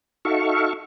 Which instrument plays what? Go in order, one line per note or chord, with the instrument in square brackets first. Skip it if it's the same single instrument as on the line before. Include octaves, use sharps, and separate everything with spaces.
[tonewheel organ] D#4 F#4 A4 E5 F5 C#6